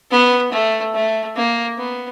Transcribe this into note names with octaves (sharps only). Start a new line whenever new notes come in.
B3
A3
A3
A#3
B3